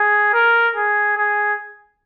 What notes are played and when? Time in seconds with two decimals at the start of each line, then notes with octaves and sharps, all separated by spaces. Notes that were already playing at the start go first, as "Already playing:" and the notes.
Already playing: G#4
0.34 A#4
0.76 G#4
1.17 G#4